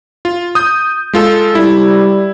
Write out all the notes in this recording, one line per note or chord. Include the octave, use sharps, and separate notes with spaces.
F4
D#6 G6
G#3 F4 A4
G3 E4